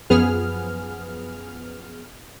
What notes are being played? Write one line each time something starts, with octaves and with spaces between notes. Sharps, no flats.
F#2 F3 B3 G#4 F6